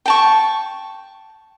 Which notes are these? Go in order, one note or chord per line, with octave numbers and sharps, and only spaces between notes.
G5 A5 C#6